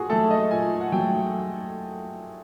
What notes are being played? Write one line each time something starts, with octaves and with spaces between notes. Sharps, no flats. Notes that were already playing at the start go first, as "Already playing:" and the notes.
Already playing: A#2 F#4 G#4
F#3 A3 A4
D#5
A#2 G#5
F#5
F#3 A3 G5